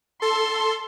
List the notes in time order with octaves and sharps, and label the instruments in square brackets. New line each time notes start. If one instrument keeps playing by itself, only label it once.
[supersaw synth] A4 [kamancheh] C6